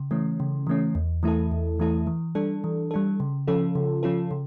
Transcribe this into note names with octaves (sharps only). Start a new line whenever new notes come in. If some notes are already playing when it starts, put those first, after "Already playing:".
Already playing: C#3
E3 A3 C#4
C#3
E3 A3 C#4
E2
E3 A3 E4 A4
E2
E3 A3 E4 A4
E3
G3 D4 A4
E3
G3 D4 A4
C#3
F3 C#4 F4 A4
C#3
F3 C#4 F4 A4
C#3